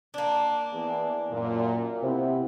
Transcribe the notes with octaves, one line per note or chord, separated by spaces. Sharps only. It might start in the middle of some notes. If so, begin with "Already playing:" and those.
A#3 D4
E3 B3 G#4
F#2 A#2
C3 B3 C4 E4